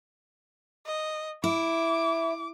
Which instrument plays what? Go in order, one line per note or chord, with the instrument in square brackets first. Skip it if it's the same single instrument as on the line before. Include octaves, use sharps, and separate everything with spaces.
[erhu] D#5
[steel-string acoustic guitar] E4 [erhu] D6